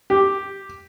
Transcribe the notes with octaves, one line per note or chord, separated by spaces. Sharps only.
G4